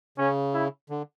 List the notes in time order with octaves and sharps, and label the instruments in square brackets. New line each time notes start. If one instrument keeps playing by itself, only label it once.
[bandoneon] C#3 [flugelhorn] C#4
[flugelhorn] E4
[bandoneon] D3